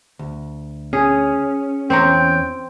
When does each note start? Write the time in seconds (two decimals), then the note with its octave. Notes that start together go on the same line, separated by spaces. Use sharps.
0.19 D2
0.93 C#4 G#4
1.90 E2 C4 C#5 G5 A#5